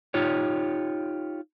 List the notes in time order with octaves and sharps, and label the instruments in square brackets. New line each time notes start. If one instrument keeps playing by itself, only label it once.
[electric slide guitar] D#4 F4 G4 C#5